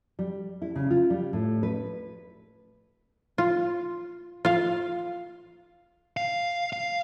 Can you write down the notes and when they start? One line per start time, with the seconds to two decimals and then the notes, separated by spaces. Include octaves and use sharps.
0.19 G3
0.62 E4
0.75 C#3
0.91 F4
1.10 G3
1.33 A2
1.63 B4
3.38 F4
4.45 F4 F5
6.17 F5
6.73 F5